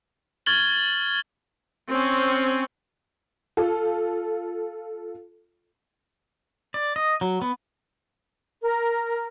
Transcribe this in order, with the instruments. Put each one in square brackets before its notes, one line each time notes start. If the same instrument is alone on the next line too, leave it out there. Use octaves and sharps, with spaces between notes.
[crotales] C#6 F6 G#6 A6 F#7 G7
[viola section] C4 C#4
[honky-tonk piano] F4 A4
[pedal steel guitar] D5
D#5
F#3
B3
[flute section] A#4